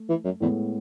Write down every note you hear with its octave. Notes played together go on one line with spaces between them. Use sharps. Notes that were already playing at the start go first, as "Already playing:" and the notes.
Already playing: A3
E3
F#2
E2 A2 G#3 B3